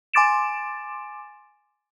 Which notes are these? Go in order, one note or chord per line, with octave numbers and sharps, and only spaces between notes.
G#5 C6 D6 A6 D7 E7